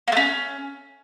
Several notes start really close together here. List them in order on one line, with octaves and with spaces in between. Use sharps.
A#3 A3 C#4